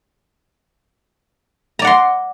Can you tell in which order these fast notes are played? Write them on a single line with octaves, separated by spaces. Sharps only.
A#5 D5 F#5 C6